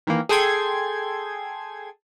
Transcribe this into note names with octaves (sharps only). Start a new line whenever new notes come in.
D#3 E3 A#3
G#4 A4 G5 C6 G#6